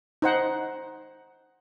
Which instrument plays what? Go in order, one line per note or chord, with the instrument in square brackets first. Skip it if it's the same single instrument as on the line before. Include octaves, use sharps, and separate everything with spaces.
[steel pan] D#4 C5 F#5